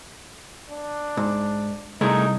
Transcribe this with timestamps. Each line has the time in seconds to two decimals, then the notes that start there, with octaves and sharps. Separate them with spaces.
0.70 D4
1.17 G#2
2.01 C2 A3 D#4 G#4 A#4